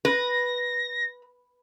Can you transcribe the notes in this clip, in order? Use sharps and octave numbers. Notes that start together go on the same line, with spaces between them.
B4 A#6